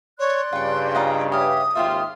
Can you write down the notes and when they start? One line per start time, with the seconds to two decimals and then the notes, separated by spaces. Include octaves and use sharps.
0.19 C#5 D5 C6 F#6
0.53 G2 C#3 F4 G5 C#6
0.95 D#4 F4 D#5
1.32 G4 B4 C#5 E5 F5 D#6
1.75 G#1 D#2 F4 G4 C5 E5 F6